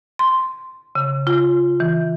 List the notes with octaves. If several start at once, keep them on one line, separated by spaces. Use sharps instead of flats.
C6
C#3
F4
E3